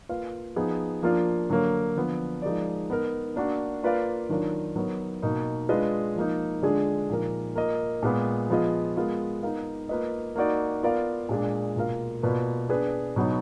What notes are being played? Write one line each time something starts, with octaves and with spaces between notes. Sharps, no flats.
A#3 F4 B4 F5
F3 B3 D#4 G#4
F3 A#3 D4 F4
D3 F#3 A#3
D3 F3 B3
F3 G#3 D#4 A#4 D5
B3 D#4 A#4
A#3 D4 F#4
A#3 F4 B4 D5 F5
D#3 F#3 D4 F4 A#4
F#3 B3 D#4 A#4
B2 A#3 D#4
G#3 D4 F4 B4 D#5
F3 A#3 D#4
D3 G#3 D4 F4 G#4
A#2 F3 A#3 D#4 A#4
A#3 F4 A#4 D#5
A#2 G#3 B3
F3 B3 F4 G#4 D#5
G#3 B3 F4 A#4
B3 D#4 A#4 F5
A#3 F4 B4 D#5
A#3 D#4 F#4 D5
B3 F4 A#4 D5 F5
A#2 G#3 D4 G#4
B2 A#3 F4 A#4 F5
B2 A#3 F4 B4 D5
B3 D4 G#4 B4
B2 F#3 B3 D#4 F#4